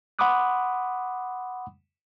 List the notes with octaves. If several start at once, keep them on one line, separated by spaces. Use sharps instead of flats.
F#5 B5 C6 D6 D#6 F#6